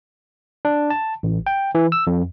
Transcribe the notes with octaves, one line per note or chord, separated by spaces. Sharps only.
D4
A5
A1
G5
E3
E6
F2